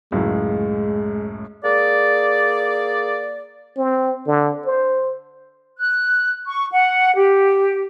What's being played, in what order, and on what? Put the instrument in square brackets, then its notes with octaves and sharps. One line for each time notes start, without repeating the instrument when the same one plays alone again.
[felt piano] C#2 F#2 A2 [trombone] G#3
[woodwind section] A#3 G#4 D5
[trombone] C4
D3
C5
[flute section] F#6
C#6
F#5
G4